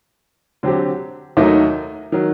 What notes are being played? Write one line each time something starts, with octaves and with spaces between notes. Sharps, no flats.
D3 F#3 C4 G4
D#2 D#3 F#3 A3 D#4
D#3 F#3